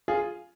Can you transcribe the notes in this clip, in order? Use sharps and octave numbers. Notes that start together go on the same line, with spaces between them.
F4 G#4